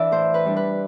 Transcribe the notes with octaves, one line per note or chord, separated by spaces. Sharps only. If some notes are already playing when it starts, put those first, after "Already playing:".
Already playing: E3 D4 D5 E5
A2 C5
B4
G3 D4
B4